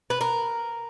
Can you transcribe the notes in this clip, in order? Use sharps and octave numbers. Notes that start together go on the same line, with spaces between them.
B4
A#4